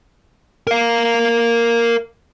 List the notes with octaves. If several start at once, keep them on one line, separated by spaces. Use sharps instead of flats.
A#4 F5